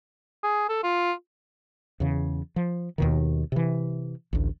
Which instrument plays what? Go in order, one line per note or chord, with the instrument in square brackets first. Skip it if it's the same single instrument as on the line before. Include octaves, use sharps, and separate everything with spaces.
[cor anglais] G#4
A4
F4
[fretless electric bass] E2 C#3
F3
D#2 B2 D#3
C3 E3
A1 D2